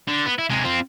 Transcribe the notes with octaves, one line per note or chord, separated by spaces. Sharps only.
D3
B3
E4
C3 G#3
C4 F4